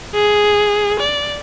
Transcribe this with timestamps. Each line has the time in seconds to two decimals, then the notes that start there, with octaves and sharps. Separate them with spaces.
0.14 G#4
1.00 D5